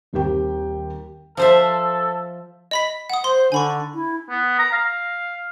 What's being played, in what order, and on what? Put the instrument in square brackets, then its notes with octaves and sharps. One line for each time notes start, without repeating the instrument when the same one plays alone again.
[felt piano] D#1 D#2 C4 G4 G5
[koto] F3 C5 E5 [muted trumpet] A4
[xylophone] D#5 B5 B6
F#5 D#6
[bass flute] C5 [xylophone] C6
[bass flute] D3 [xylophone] G#5 B5 C#6
[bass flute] E4
[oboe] B3
A#5
F5